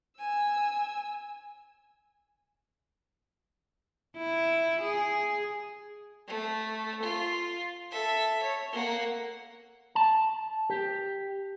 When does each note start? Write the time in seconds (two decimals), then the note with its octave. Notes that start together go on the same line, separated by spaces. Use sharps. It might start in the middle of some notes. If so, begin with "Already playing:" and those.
0.18 G#5 E6
4.17 E4
4.80 G#4
6.27 A3
7.02 F4
7.91 A4 E5
8.43 C#5
8.72 A#3 F#5
9.95 A5
10.70 G4